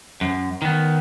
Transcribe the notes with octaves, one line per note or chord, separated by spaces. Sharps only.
F#2
D#3 B3